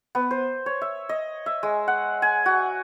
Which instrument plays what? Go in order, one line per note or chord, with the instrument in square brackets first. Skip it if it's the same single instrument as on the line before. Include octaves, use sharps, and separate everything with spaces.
[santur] B3
C5
C#5
E5
D#5
E5
G#3
F#5
G#5
F#4